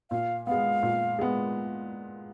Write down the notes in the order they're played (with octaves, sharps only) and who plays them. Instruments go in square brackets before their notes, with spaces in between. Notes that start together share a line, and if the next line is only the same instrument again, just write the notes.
[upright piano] A#2 [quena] F5
[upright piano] G#3 B3 [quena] F5
[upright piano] A#2
G#3 B3